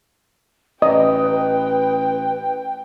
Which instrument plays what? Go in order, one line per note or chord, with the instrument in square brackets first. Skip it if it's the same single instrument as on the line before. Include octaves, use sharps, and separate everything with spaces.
[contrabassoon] A1 [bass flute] B4 [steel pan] D#5 [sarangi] G5